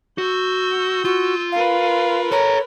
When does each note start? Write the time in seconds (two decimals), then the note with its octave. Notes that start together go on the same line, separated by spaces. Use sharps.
0.18 F#4 E6 G6
1.05 F4 F#4
1.52 A#4 B4 F5
2.32 A4 C#5 A#5